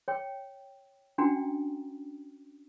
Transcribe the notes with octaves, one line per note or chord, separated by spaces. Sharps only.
C#5 G5
C#4 D4 F#4 F#5 G5 A#5